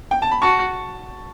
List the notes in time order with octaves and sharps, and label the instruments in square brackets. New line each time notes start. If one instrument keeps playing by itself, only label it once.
[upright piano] G5
A5
B5
[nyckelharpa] F#4 [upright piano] A5 C#6